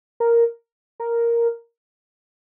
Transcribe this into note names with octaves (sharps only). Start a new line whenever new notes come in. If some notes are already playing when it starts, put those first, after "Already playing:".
A#4
A#4